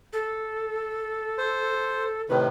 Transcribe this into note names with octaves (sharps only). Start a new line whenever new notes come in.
A4
C5
A2 C3 D#3 B4